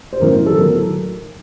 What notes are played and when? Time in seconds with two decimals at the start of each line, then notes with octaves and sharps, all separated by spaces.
0.13 C5
0.20 A1 A2 F#3 A#4
0.46 A4
0.58 A2 F#3 A#4